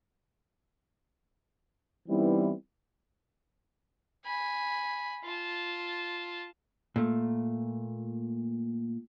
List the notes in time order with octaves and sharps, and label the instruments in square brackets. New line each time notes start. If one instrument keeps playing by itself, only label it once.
[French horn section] E3 G3 B3 C4 D#4 E4
[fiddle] G#5 B5
F4 A5
[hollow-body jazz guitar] A#2 A3